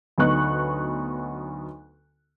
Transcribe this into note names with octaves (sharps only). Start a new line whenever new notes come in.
D2 F#3 B3 D#4 C#6 F#6